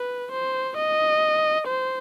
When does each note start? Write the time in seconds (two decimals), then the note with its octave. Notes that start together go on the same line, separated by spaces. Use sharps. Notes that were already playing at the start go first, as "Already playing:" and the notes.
Already playing: B4
0.32 C5
0.77 D#5
1.67 C5